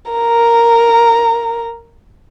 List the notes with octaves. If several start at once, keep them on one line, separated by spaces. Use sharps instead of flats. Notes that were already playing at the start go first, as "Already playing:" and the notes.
A#4 A#5